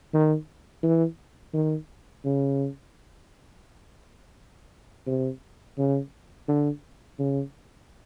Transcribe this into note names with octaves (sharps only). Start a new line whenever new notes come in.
D#3
E3
D#3
C#3
C3
C#3
D3
C#3